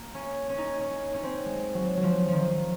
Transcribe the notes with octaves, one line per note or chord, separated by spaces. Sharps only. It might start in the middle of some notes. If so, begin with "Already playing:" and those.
Already playing: A#3
C#4
C#4
D#4
C#4
C#4
C4
G#3
F#3
F#3
F3
D#3 F3